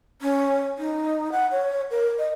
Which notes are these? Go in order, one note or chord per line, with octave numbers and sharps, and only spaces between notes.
C#4
D#4
F#5
C#5
A#4
D#5